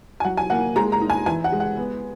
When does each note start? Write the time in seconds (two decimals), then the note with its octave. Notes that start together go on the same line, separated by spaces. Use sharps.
0.20 G#5
0.25 F#3 F#5
0.37 G#5
0.50 A#3 F#5
0.76 G#3 A#5
0.92 A#5
1.02 D#4
1.10 G#5
1.26 E3 G#5
1.44 F#5
1.52 G#3
1.60 F#5
1.77 B3